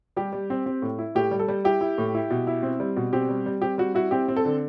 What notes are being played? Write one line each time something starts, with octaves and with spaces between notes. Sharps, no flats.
G3 G4
G3
C4
C4
A2
E4
A2 G4
G3
A4
G3
E4 G4
E4
A2
E4
B2
E4
C4
G3
B2
C4 G4
G3
G3
C4 G4
G3 F#4
E4 F#4
C4 G4
C4
A4
D3